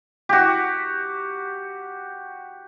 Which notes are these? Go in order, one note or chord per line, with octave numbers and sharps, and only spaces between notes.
F#4 G4